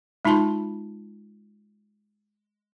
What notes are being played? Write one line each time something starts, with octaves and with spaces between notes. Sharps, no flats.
G#3 D#4 F4 A5 B5 C6